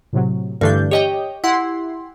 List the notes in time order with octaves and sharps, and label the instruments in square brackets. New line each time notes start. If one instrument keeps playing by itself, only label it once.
[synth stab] A2 C3 F#3
[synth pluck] G2 D4 G6 [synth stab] D3 E3 A3
[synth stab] G4 [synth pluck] C#5 D#5 G5
[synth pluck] E4 F#5 C6